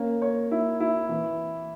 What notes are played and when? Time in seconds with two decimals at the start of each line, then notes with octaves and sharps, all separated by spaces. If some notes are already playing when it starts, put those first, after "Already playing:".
Already playing: A#3 C#4
0.22 C#5
0.51 E4
0.80 E4
1.09 E3